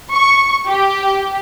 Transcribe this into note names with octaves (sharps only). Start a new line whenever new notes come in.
C#6
G4